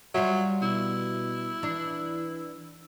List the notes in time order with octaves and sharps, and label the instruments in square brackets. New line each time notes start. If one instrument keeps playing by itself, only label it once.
[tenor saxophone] F#3 [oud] G3 F4 E5
[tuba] B2 [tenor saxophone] E4
[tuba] E3 [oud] D4